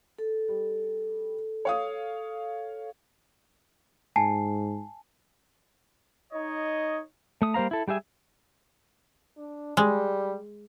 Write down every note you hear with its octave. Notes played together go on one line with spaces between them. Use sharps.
A4
G3
C#5 F5 D#6
G#2 G#5 A5 C7
D#4 C#5 D#5
A3 D#6
G3 A#3 C5 F5 A#5
E4 A4
G3 G4 G#4 E5 G#5
D4
G3 G#3